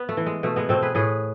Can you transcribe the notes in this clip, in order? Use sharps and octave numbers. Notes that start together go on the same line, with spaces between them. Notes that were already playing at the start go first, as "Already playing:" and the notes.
Already playing: B3
A3
E3
G#3
B2 A3
G#3 B3
B2 A3 C4
G#4 B4
A2 G#4 B4